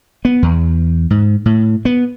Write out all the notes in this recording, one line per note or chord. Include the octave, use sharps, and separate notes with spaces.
B3
E2
G#2
A2
B3